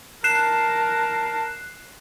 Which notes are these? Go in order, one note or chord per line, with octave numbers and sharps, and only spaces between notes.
A#4 A5 F#6 C7 E7